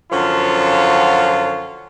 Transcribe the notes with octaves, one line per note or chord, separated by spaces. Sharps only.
F#2 D3 F3 C#4 F4 A5